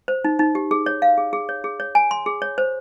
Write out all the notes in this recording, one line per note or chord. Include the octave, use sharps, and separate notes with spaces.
C5
D#4
D#4
G4
G#4
C#5
F5
G#4
G#4
C#5
G#4
C#5
G#5
C6
G#4
C#5
C5